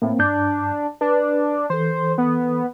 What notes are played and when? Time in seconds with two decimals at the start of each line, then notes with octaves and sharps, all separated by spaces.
0.02 A2 A#3 C4
0.19 G2 D4 G6
1.01 D4 B4
1.70 E3 A4 C5
2.18 B3